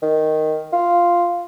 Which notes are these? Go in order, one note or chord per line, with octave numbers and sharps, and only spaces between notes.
D#3
F4